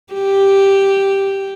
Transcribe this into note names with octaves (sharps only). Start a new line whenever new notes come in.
G4